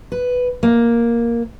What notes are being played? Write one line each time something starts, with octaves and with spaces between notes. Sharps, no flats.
B4
A#3